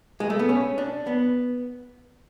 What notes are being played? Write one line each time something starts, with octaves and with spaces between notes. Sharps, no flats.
G#3
A3
B3
C#4
D4
B3